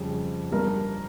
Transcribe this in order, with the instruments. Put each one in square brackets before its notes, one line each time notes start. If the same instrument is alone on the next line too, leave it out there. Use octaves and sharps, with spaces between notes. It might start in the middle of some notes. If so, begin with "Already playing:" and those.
Already playing: [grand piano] F2 C#3 G3
G2 G3 A#4